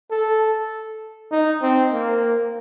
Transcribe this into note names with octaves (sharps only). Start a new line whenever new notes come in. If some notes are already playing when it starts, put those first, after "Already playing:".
A4
D#4
C4
A#3